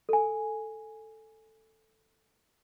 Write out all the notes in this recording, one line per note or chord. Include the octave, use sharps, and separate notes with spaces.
A4 G#5